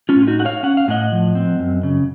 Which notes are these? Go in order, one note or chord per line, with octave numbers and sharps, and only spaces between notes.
C#4 F4
A2
F4
D#4 F#4
A3 F#5
C#5 F5
C#4 F#5
F5
A2 D#5 F#5
F3
C4
F#2
C#3